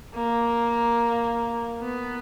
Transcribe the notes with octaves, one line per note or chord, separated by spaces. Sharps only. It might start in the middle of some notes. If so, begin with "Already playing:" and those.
A#3
B3